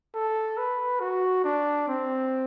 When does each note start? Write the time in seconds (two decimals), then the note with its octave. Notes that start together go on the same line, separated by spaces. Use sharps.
0.15 A4
0.58 B4
1.00 F#4
1.44 D4
1.88 C4